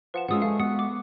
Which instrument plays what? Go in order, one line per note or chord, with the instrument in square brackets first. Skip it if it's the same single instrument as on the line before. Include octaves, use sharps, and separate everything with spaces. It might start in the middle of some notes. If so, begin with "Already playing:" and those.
[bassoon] F3 [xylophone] B4 F#5 E7
[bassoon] C#3 [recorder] G#3 [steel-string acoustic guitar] C#4 F4 G#4 [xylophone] F#5 D#6 E6
[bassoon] A3 [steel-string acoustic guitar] G#4 G#5 [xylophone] F5
[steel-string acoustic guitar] B3 B4 [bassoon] F#4 [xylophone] D#6 C#7
[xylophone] D6